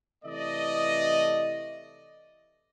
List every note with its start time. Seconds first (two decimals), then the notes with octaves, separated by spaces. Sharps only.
0.24 C3 E3 A3 D5 D#5